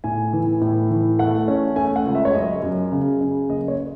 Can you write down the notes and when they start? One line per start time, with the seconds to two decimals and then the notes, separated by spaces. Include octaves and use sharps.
0.04 A2 G#5
0.33 E3
0.61 A2
0.90 E3
1.19 A3 F#5
1.48 C#4
1.76 A3 G#5
1.96 F#5
2.05 C#2
2.15 E5
2.25 C#5
2.34 F#2 D#5
2.63 F#2
2.92 C#3
3.21 C#3
3.49 F#1 D#5
3.68 C#5